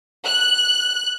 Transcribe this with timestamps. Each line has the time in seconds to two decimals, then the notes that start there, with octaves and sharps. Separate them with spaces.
0.24 F#6